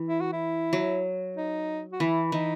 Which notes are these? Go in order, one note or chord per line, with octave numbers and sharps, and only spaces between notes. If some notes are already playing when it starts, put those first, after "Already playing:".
Already playing: E3
E4
F#4
E4
F#3
D#4
F#4
E3 E4
E3 D#4